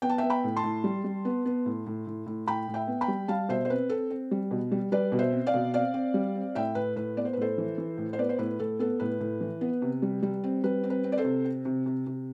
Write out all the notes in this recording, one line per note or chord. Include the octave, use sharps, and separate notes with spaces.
B3 G5
A5
B3 E5 G5
G5 B5
A2
A5 C6
A2
G3
G3
B3
B3
A2
A2
A2
A2
A2 G5 B5
A2
E5 G5
B3
G5 B5
G3
G3 F5 A5
B2 C5 E5
C5
C4 B4
C4 A4
C4
G3
B2
G3
G3 B4 D5
B2
C5 E5
C4
D5 F5
B2
C4 D5 F5
C4
G3
C4
A2 E5 G5
A2 B4
A2 B4
B3 D5
C5
B4
A2 A4 C5
E3
E3
A2
C5
B3 B4 D5
C5
A2 B4
A2 A4
B3 A4
A2 B4
A2
E3
B3
C3
G3
G3
C4
G3 B4
C4
B4
C4
D5
A4 C5
C3
C4
C3
C3
C3